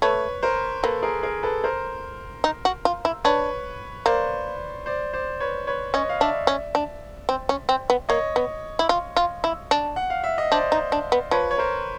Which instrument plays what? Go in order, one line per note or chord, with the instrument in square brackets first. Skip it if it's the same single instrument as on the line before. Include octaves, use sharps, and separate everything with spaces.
[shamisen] A3 [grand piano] B4 C#5
[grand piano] A#4 C5
[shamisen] A#3 [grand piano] A4 B4
[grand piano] G#4 A#4
G#4 A#4
A4 B4
A#4 C5
[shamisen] D#4
F#4
F4
E4
[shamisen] D4 [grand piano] B4 C#5
[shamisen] A#3 [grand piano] C5 D5
[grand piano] C5 D5
C5 D5
B4 C#5
B4 C#5
[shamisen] C#4 [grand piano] C#5 D#5
[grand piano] F5
[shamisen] D4 [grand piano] D5 E5
[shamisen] C#4
D4
C4
C#4
C4
B3
[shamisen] A#3 [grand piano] C#5 D#5
[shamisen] B3
E4
F4
F4
E4
D4
[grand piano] F#5
F5
E5
D#5
[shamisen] D4 [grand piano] C5 D5
[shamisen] D#4
D4
B3
[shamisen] F3 [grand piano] B4 C#5
[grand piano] C#5
A#4 C5